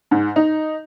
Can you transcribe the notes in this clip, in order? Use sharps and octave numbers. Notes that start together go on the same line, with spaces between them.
G#2
D#4